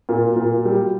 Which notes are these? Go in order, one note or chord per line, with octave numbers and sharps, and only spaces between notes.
A#2
A#2
G3